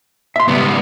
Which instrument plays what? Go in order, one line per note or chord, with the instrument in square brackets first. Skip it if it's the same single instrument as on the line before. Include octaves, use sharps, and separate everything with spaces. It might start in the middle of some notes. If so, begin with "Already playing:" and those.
[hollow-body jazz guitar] E5 C6
[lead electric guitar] C#2 B3 [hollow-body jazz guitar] G3